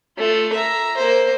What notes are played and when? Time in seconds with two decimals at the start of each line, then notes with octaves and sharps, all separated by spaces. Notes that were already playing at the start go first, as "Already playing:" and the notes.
0.18 A3 F4
0.53 E5 A#5
0.97 A#3 C5